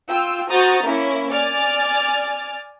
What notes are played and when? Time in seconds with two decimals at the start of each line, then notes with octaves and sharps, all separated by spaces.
0.10 F4 G5 E6
0.50 F#4 C5 A#5 D#6 G6 A6
0.84 A#3 C#4 E4
1.31 D5 G#5 F6 A6